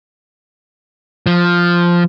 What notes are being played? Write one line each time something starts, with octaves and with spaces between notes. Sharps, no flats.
F3